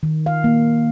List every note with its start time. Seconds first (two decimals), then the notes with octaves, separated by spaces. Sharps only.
0.03 D#3
0.26 F5
0.44 A#3